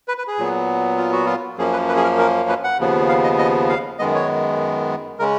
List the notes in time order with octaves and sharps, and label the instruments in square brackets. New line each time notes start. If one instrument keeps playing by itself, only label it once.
[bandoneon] B4
B4
G#4
A#2 F#3 B3
F4
F#4
F4
F#2 F3 A#3 C#4 G#4
B4
B4
G#4
A#4
A#4
B4
F#5
D#2 C#3 F3 B3
F5
D#5
D#5
F5
F#2 D#3 G#3 B3 D#5
C#5
C#3 G#3 C#4 A#4